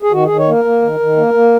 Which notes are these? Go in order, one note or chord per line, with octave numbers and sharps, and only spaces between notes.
G#4
D#3 F#4
D#3 G#4
C#5
A#3 A#4
A#3
D#3
D#3
A#3
A#3